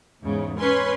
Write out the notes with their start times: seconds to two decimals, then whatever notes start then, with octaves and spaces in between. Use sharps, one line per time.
0.24 E2 G#2 C#3
0.59 C#4 B4 G#5 C6